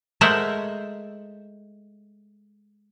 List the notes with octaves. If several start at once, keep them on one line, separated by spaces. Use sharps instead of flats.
G#3 A3 A#4 C5 E5 F#5